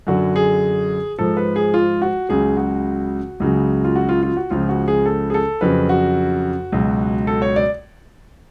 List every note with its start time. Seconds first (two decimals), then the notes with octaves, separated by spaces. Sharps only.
0.07 F#2 D3 F#3 F#4
0.36 G#4
1.19 G#2 F3 A4
1.37 B4
1.56 G#4
1.74 F4
2.02 F#4
2.29 C#2 C#3 F#3 G#4
2.57 F#4
3.40 C#2 C#3 F#3
3.84 F4
3.96 F#4
4.09 F4
4.23 F4
4.37 F#4
4.50 C#2 C#3 F3 F4
4.69 F#4
4.88 G#4
5.06 A4
5.30 G#4
5.34 A4
5.61 F2 C#3 F#3 B4
5.89 F#4
6.72 C#2 B2 F#3
7.27 A4
7.42 C#5
7.56 D5